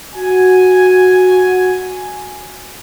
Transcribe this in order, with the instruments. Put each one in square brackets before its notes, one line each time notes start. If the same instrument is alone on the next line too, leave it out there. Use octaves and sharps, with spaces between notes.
[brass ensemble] F#4 G#5